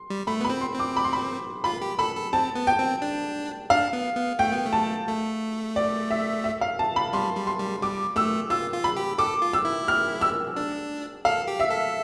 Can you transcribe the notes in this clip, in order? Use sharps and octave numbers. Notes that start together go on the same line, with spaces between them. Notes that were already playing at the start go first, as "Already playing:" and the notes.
Already playing: C6
G3
A3 B5
B3 B5
C4
C6
C4
D6
B5
C6
B5
F4 B5
G4
A4 B5
A4
C4 A5
B3
G5
C4
D4
D4 F5
B3
B3
A3 G5
B3
A3
A5
A3
D5
E5
E5
F5
A5
B5
G3 C6
G3
C6
G3
G3 D6
A3 E6
F4 E6
F4
B5
G4
A4 D6
F4
E6
E4
F6
E6
D4
A4 F5
G4
E5
A4